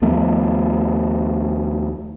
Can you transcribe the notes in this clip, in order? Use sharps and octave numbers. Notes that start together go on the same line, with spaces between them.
D#2 F3 A3 B3